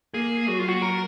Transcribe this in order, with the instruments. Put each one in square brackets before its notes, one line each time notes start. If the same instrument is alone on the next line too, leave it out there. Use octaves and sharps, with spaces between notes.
[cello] A#3 [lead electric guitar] G#4
[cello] F#3 [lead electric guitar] F#4
[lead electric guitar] F4
F#4
A#4